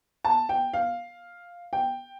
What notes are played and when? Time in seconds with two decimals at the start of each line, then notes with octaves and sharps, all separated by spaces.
0.25 A5
0.49 G5
0.73 F5
1.73 G5